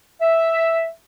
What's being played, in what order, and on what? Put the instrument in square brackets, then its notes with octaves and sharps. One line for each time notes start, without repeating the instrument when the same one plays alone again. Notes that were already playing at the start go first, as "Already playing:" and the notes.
[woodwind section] E5